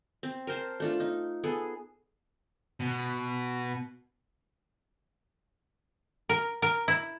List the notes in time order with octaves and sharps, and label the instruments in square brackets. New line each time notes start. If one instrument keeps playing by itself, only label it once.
[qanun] C4
A#4 C5 A5
A3 D4 F4
D#4
B3 G#4 A4
[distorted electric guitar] B2
[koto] A#4
A#4
E4